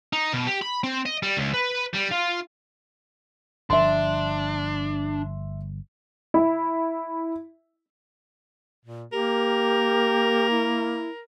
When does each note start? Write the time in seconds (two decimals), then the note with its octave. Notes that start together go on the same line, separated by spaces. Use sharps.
0.13 D#4
0.34 B2
0.48 G4
0.62 B5
0.84 C4
1.05 D#5
1.23 G3
1.37 C#2
1.54 B4
1.95 G3
2.12 F4
3.70 G1 F3 D4 E5 C6
6.34 E4 E5
8.85 A#2
9.12 A#3 G4 A#4
10.51 E4